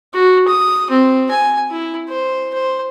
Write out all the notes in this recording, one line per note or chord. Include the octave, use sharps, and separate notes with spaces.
F#4
D#6
C4
G#5
E4
C5
C5